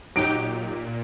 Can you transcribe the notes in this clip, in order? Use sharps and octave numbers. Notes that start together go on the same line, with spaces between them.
A#2 F#3 D#4 G4 D7